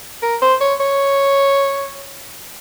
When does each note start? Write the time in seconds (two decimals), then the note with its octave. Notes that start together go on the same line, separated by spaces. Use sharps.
0.22 A#4
0.42 C5
0.61 C#5
0.80 C#5